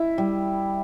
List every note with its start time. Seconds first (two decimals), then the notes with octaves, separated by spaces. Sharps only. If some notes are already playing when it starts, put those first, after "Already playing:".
Already playing: E4
0.18 G3